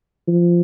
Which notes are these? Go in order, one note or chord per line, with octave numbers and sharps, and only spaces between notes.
F3